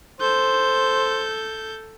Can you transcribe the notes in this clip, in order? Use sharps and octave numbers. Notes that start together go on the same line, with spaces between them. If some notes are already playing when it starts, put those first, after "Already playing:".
A4 C5 G6